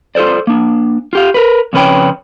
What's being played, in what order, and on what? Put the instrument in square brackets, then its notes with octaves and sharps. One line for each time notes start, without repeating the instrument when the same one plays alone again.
[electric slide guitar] F4 A4 A#4 C5 D5
A#3 D4
F4 G4 F5
A#4 B4
F2 C#3 C#4 B4 C#5 G5